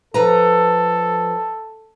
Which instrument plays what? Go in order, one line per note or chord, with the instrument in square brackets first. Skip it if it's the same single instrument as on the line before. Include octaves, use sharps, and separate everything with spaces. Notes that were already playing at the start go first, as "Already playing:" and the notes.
[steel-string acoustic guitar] F3 B4 A#5 [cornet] A4